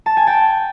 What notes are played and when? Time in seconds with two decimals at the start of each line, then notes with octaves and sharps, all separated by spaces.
0.06 A5
0.17 G#5
0.27 G5 A5